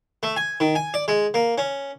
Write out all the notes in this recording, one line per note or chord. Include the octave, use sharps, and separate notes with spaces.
A3
G#5
D#3
G#5
D5
G#3
A#3
C#4